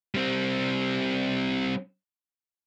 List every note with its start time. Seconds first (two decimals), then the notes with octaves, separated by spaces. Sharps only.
0.15 G3 C4